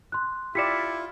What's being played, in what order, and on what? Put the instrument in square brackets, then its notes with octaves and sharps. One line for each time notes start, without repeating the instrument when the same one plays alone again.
[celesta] C6 F#6
[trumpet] E4 [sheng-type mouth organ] F4 [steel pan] G4 D5 [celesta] B6 C#7 E7